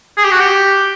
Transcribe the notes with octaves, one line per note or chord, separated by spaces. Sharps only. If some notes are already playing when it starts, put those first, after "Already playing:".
G#4
G4
F#4
G4